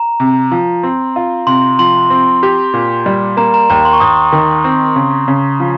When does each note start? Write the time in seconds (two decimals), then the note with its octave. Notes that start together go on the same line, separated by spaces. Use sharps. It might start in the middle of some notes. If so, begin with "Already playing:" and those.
Already playing: A#5
0.20 C3
0.52 F3
0.83 C4
1.16 F4
1.47 C3 C6
1.79 F3 C6
2.10 C4
2.43 G4
2.74 A#2
3.06 G3
3.37 A#3 A#5
3.54 A#5
3.70 D#2 A#5
3.85 C6
3.93 C#6
4.00 D#2 D#6
4.33 D#3
4.65 C4
4.96 C#3
5.28 C#3
5.60 F3